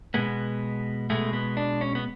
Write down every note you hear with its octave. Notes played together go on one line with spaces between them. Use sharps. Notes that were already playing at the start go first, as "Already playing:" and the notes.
B2 G#3 B3
B2 G#3 A3
B3
D4
C#4
B3